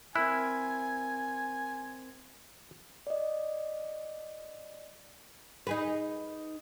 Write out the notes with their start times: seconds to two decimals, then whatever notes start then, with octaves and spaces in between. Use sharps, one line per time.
0.16 C4 E4 A#4 G#5 F#6
3.07 D5 D#5
5.67 D#4 G#4 B4